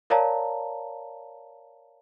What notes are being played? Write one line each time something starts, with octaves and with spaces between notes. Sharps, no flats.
A#4 C#5 D5 F5 A5 A#5